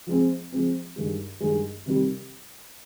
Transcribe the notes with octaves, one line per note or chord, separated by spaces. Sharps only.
F3 G#3 C4
F3 G#3 C4
G2 D#3 G#3
G2 D#3 G#3
C3 D#3 G3